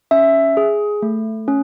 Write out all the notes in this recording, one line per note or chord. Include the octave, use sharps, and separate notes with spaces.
C#4 E5
G#4
A3
C#4